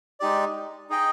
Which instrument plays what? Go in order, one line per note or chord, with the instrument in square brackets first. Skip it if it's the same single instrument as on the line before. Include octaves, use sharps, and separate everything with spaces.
[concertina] G#3 D#4 G4 D5
D#4 G#4 D#5 G5